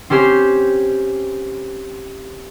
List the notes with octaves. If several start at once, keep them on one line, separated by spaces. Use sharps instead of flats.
C4 C#4 G4 C5